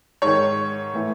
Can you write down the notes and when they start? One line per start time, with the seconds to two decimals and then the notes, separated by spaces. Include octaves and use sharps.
0.22 G#2 D#3 C#5
0.93 A2 E3